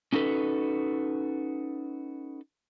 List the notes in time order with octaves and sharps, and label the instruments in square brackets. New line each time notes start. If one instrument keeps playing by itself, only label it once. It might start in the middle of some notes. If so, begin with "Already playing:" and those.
[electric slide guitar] C#4 D#4 F#4 A4 B4